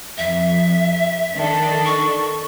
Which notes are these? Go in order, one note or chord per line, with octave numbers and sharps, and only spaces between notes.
F2 E5
D#3 D4 A4
C#6